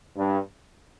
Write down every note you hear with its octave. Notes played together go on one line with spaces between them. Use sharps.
G2